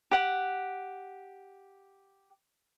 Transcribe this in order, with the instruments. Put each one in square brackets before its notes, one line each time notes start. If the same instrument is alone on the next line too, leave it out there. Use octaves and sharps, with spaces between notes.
[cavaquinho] G4 F#5